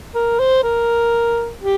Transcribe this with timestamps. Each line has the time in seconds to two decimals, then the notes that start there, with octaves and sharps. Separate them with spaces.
0.15 A#4
0.39 C5
0.63 A#4
1.61 G4